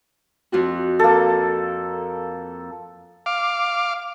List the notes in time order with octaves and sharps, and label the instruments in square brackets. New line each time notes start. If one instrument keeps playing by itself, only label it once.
[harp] F2 F4 F#4
[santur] A#3 A4
[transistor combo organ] F5 D6